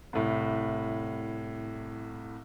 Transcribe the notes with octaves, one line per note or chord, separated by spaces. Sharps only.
C2 A2